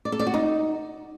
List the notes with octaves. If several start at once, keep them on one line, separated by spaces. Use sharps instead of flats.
D5
A4
D5
F#4
D#4